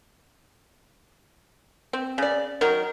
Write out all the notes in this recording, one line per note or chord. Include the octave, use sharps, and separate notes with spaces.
C4
C#3 D5
D#3 F#3 A#4